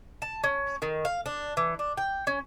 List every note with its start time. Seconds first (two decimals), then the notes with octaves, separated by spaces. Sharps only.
0.22 A5
0.44 C#4
0.82 D#3
1.05 F5
1.26 D4
1.57 E3
1.79 D4
1.98 G5
2.27 C#4